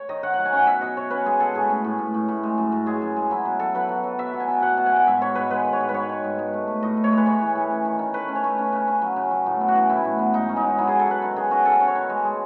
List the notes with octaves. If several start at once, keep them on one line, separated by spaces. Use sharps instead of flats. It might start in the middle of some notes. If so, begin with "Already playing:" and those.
Already playing: C#5
D#3 D#5
D#3 F#5
F#3 F#5
G#5
C#4 F#5
B2 E5
B2 D#5
B2 C#5
C#4 B4
G#3 G#4
G#3 A4
A2 G#4
C#4
A2
A2
A2
A2
G#3
F#2
F#2
G#3 G#4
F#2
G#3
F#3 E4
B2
F#3 A4
F#3 B4
F#3
F#3
B2 E5
B2
G#5
B2
B2 F#5
B2
G#5
B2 F#5
G#2 E5
D#3 C#5
G#2 B4
G#3 B4
D#3
C#5
G#2
B4
G#2 C#5
D#3
G#2
G#2
A3
A3
A2 D#5
A2
C#5
G#3
B4
A2 C#5
E3
A2
C#4
D#3
D#3
A3 B4
C#4
C#5
A3
C#4
C#3
C#4
F#3
C#3
F#3
A2
B3
F#4
E3
A2 E4
A2
B3
G#2 D#4
C#4
D#4
G#2
F#3 E4
F#3 G#4
A4
F#3 B4
D#3
D#3 G#4
C#4 F#4
C#4 A4
C#4
C#5
D#3
G#3
G#3